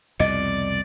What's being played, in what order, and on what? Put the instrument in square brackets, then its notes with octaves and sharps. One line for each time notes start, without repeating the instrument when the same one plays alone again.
[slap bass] C2 F2 B2 [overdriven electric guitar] D5 [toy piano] D#5